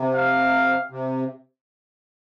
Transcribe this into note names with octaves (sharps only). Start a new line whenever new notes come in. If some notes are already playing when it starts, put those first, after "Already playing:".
Already playing: C3
F5
C3